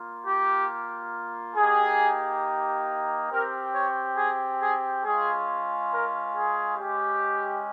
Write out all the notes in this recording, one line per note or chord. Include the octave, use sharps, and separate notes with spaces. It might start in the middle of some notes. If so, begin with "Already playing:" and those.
Already playing: A#3 F4
G4
A#3 D#4 G4 G#4
C4 G4 A#4
C#5
G#4
G#4
G#3 C#4 F4 G#4
A#4
G#4
G#3 C#4 G4